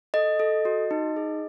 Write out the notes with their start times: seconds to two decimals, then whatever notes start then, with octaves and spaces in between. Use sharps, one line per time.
0.14 A4 D#5
0.39 A4
0.65 F#4
0.91 D#4
1.16 G#4